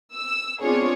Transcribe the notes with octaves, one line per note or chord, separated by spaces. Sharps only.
E6
B3 C4 D4 F4 G#4 C#5